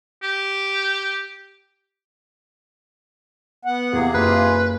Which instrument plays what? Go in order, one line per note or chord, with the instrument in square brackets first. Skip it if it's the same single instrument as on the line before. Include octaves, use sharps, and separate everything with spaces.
[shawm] G4
[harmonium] B3 F#5
[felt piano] E2 [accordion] C3 A#3 G#4
[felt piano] F#1 [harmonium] F4 [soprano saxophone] B4